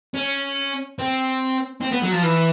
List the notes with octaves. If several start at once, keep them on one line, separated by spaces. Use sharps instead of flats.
C#4
C4
C4
B3
F#3
F3
E3